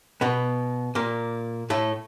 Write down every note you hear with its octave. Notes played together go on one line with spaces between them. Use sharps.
B2 B3
A#2 A#3
A2 A3